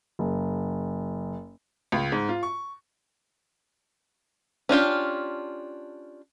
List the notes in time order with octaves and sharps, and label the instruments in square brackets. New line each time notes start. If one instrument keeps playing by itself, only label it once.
[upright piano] F#1
C#2
G#2
F4
C#6
[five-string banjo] C#4 D4 F4 G4